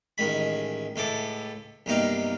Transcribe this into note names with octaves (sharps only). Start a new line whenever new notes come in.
A1 D#3 G#3 B5
C#2 A2 A4 D6
B1 G2 C3 A#3 D#4 F5